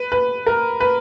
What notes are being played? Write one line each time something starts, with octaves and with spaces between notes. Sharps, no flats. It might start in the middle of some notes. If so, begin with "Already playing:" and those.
Already playing: B4
B4
A#4
B4